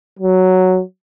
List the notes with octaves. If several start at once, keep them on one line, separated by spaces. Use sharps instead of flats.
F#3